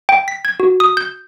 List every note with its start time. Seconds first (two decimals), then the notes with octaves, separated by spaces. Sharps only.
0.09 G5
0.28 B6
0.45 G#6
0.60 F#4
0.80 D#6
0.97 G6